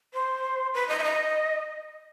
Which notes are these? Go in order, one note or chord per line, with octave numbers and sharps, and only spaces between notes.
C5
B4
D#5
E5
D#5